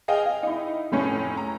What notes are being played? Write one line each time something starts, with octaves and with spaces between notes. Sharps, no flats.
G#4 D#5 F5 G5
F5
D#4 E4
F1 A2 C#4
A#5